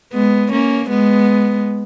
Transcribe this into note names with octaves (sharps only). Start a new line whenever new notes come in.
G#3 B3
A#3 C#4
G#3 B3